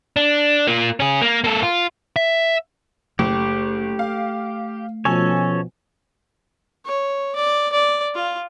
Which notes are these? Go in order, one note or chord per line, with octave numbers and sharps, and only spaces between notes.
D4
A#3 F4
C#4 G#4
A#3
A#3 A4
F4
E5
F#1 A3 G4
F5
B2 F3 C#4 A4 C#5 G#5
C#5
D5
D5
F4